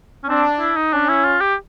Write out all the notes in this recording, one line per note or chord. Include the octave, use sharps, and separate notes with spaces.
C#4
C4 D4
E4
D#4
C#4 D4
E4
F4
G4